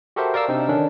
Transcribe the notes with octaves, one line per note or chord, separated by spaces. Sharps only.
F#4 G4 A4 A#4 C5 E5
A#4 D5 F5 E6
C3 C4 D4 D#4
D3 D#3 C#4 D4